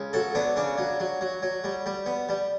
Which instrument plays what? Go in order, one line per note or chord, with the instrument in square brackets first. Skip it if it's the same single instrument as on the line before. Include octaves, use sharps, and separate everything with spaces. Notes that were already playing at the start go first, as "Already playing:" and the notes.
Already playing: [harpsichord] C#2
F#3 A4
B3 D4
C#3 D4
F#3
F#3
F#3
F#3
G3
G3
B3
G3